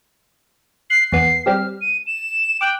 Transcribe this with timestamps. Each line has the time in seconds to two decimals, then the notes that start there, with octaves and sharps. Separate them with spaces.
0.90 F#6 C7
1.12 E2 B3 C7
1.46 G3 C4 G4 F6
1.81 D#7
2.07 E7
2.61 G5 D6 F#6